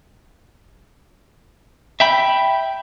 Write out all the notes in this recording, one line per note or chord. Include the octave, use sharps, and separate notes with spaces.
E5 G5 B5